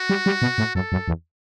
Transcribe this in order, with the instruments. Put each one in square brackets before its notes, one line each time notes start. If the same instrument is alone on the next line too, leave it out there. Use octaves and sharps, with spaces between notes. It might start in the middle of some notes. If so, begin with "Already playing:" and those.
Already playing: [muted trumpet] F#4
[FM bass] G3
G3
B2
A2
[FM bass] F#2 [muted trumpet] A4
[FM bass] F#2
E2